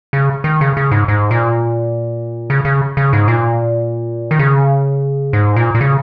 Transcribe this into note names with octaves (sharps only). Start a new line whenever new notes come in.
C#3
D#3
C#3
C#3
G#2
G#2
A#2
C#3
C#3
C#3
G#2
A#2
D#3
C#3
G#2
A#2
A#2
C#3